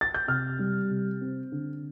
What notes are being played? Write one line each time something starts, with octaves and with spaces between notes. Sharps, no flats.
A6
G6
C3 F6
G3
C3
C4
D3